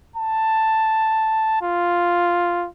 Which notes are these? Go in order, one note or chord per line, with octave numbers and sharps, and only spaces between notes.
A5
F4